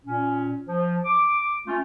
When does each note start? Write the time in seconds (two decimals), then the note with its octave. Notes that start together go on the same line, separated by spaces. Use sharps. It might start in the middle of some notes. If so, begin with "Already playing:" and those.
0.05 A#2 C#4
0.67 F3
1.04 D6
1.66 A3 C#4 F4